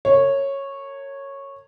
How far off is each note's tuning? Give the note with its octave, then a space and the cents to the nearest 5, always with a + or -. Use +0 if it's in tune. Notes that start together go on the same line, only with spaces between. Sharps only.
A#4 -40 C#5 -10